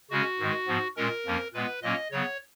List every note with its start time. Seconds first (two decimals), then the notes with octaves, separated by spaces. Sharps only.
0.10 C#3 G#3 C#4 F#4
0.39 G#2 D#3 G#3
0.68 G#2 F3 B3
0.96 A#2 G#3 C#4 A#4
1.26 F2 F3 A#3 C#4
1.54 A#2 G#3 B3 B4
1.82 A#2 F#3 A#3 C#4 D#5
2.11 C#3 F#3 B3 C#5